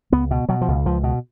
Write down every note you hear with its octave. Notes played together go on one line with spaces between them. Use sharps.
C#2 B3
B2
B2 F#3
F3
C#2
C#2 F3
B2